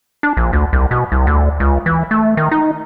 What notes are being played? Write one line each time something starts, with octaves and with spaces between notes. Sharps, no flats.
D4
A#1
D2
C2
B2
C2
D2
C#2
E3
A3
D#3
D#4